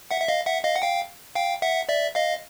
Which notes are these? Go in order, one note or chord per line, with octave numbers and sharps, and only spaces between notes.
E5 F#5
E5
D#5 F5
E5 F#5
D#5 F5
F#5
F5 G5
F5 G5
E5 F#5
D5 E5
D#5 F5